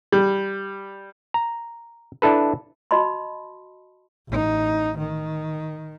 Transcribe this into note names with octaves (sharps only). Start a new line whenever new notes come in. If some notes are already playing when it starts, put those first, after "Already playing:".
G3
A#5
D4 E4 A4 B4
F#4 D#5 A5 B5 C6
A1 D#4
D#3